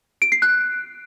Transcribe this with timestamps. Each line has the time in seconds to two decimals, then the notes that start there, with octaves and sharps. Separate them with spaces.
0.22 D7
0.32 C7
0.42 F#6